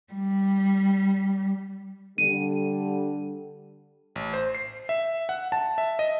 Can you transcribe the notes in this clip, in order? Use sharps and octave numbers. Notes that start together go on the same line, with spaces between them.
G3
D3 G3 D#7
A1
C5
C7
E5
F#5
A5
E5
D#5